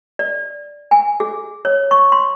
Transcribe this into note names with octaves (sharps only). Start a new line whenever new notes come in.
D5
G#5
G#4
C#5
C#6
C6